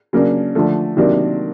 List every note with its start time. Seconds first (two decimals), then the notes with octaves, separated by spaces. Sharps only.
0.13 C#3 F#3 A#3 D4
0.55 D3 F3 A3
0.97 C3 D#3 F#3 A#3 D4